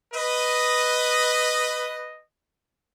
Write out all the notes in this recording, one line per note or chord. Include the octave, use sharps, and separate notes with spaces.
B4 D#5